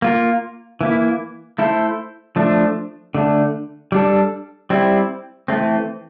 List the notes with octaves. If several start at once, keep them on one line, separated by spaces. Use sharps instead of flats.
A#3 F4 A#4
E3 A#3 E4
A3 E4 A4 C5
F3 A3 D4
D3 A3 D4
G3 D4 A4
G3 C4 E4
E3 A3 C4